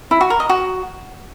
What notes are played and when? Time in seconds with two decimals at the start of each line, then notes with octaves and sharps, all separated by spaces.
0.11 E4
0.21 F#4
0.30 A#4
0.40 D#5
0.49 F#4